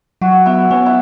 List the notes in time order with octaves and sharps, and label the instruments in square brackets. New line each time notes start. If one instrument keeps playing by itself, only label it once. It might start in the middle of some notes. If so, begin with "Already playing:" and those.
[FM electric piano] F#3 [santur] F#4
[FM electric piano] B3 [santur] E4
[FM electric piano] B3 [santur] C#4
[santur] E4